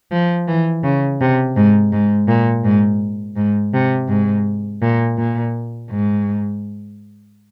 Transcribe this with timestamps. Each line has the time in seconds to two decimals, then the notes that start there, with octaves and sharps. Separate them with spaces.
0.11 F3
0.48 E3
0.84 C#3
1.21 C3
1.57 G#2
1.92 G#2
2.28 A#2
2.65 G#2
3.37 G#2
3.74 C3
4.09 G#2
4.82 A#2
5.18 A#2
5.90 G#2